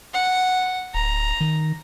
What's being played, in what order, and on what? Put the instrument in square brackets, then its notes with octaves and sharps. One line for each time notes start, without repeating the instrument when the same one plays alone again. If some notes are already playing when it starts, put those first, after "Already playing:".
[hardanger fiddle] F#5
[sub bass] D1 [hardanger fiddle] A#5
[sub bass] D#3